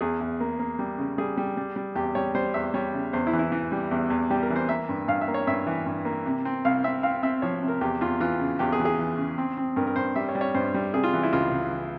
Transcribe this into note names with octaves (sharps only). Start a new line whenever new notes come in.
E2 G#4
E2
A#3
A#3
G3
C#3
G3 G#4
G3
G3
G3
E2 G4
G3 C#5
G3 C5
E2 E5
G3 C#5
C#3
E2 C5
E4
E3
E4
E3
G3
E2
E2
G3 G4
A#4
E3
C5
A#3 E5
G2
G2 F5
E5
A#3
C#5
G2 E5
E3
G2
A#3
C3
C4
C2 F5
C4 E5
C4 F5
C4 E5
F3 C#5
C3
A#4
E2 G4
E2 F4
E3 F4
C#3
E2 G4
G#4
E3
G#4
E3
C#3
C4
C4
G2 A#4
A#4
G2 C5
G3 E5
C#5
G3
C#5
G2 C5
G3
C3 G#4
F4
E3
E4
C#2 F4
C#2
E3